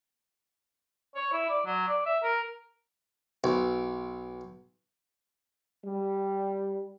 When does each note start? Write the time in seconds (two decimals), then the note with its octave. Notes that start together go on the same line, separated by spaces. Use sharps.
1.15 C#5
1.32 E4
1.49 D5
1.66 F#3
1.87 D5
2.06 E5
2.23 A#4
3.44 B1
5.85 G3